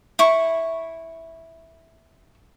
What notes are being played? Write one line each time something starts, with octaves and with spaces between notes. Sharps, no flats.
E4 C#6